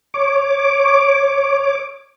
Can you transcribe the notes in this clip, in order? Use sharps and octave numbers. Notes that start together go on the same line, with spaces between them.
C#5 D6